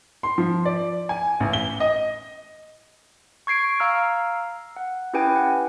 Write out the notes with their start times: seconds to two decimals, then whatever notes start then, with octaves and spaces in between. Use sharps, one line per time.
0.23 C6
0.38 F3
0.65 D5
1.09 G#5
1.40 A1
1.53 G7
1.80 D#5
3.47 C#6 G#6 C7 D7
3.80 F5 A#5 E6 F6
4.77 F#5
5.13 C#4 E4 G4 B4 G5 G#5
5.36 F#5